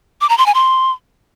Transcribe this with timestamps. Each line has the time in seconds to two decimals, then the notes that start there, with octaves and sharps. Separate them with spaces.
0.21 D6
0.29 A#5
0.38 C6
0.46 G#5
0.55 C6